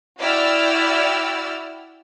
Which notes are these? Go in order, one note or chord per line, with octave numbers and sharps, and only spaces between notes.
E4 F#4 D5 G5 E6 F6